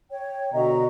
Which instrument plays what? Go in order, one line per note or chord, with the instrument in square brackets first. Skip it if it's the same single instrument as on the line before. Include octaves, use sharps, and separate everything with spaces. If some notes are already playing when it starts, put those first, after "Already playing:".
[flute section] C#5 G5
[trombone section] B2 D3 F#4 [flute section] D#5 E5 A#5